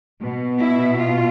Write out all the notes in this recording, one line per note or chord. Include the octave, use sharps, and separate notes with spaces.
B2
E4
F4